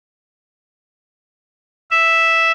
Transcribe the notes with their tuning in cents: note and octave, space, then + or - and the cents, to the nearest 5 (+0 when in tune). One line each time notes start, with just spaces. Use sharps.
E5 +0